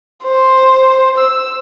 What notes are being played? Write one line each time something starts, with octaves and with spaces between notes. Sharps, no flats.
C5
E6